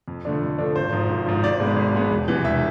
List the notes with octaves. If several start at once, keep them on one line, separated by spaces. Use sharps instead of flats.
F2
D3 F3 A3 D4
F2
D3 F3 A3 D4
G#1 C5
G#2 F3
G#1
G#2 F3
G#1 D5
G#2 G#3 B3
G#1
G#2 G#3 B3
E1
E2 C3 E3
E1 E5